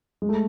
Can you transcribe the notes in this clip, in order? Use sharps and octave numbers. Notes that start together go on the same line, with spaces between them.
G#3
A3